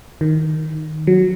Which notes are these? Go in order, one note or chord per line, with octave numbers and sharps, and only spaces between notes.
D#3
F#3